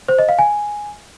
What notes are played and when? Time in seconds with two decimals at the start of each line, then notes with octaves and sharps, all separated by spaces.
0.08 C5
0.19 D#5
0.29 F5
0.39 G#5